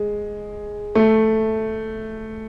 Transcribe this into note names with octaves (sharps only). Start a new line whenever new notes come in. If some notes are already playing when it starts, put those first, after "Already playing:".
Already playing: G#3
A3